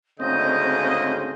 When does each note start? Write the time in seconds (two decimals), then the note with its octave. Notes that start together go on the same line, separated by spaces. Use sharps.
0.20 D2 G#2 C#3 C4 D#5 G6